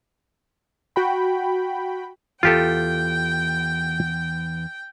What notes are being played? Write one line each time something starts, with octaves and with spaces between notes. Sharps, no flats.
F#4 G5 B5
E2 F4 G4 A4 G5